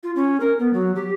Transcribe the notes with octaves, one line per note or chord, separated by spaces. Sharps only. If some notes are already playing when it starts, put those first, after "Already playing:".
F4
C#4
A#4
B3
F#3
G4